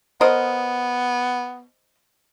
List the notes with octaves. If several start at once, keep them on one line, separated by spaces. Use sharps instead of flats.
B3 A#4 C5 D#5